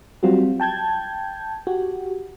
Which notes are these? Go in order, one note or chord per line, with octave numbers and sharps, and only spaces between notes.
F#3 G3 C4 F4 F#4
G5 A5 G6 G#6
F#4 G4